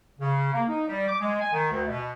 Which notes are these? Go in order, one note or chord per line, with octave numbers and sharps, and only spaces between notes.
C#3
A#3
D#4
G3
D6
G#3
G#5
D#3
D2
B2